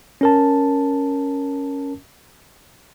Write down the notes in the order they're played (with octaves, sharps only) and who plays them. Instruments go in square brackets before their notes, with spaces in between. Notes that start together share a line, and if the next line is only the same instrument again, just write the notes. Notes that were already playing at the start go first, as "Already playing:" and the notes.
[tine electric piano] C#4 A#4 A5